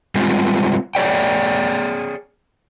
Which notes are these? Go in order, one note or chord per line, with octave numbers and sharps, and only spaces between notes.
G3 G#3 C4 F4 G4 G#4
G#4 C#5 D5 G5